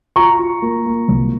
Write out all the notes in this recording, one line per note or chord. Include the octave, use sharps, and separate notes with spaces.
F4 A#5 C#6
F4
A#3
A#3
C2